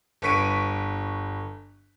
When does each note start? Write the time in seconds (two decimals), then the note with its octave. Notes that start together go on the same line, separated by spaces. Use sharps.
0.22 G1 B4 C#6 B6 D7 D#7